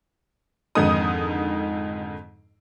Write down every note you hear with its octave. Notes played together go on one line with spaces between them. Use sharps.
F2 G#2 D3 D#3 D#4 D#6